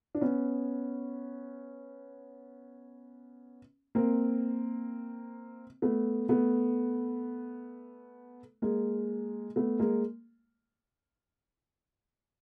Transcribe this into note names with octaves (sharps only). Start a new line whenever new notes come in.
D4
B3 C#4
A#3 C4
A3 B3
A3 B3
G#3 A#3
A3 B3
G#3 A#3